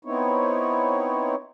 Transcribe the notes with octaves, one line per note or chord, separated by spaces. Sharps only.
B3 C4 D#4 E4 C#5